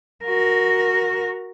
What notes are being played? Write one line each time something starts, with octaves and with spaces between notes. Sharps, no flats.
F#4 A#4